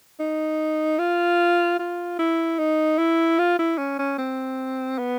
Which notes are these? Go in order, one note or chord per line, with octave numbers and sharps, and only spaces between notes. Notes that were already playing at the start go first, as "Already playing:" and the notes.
D#4
F4
F4
E4
D#4
E4
F4
E4
C#4
C#4
C4
B3